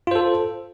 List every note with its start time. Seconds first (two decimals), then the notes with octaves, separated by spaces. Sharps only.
0.07 F4
0.11 C5
0.15 A4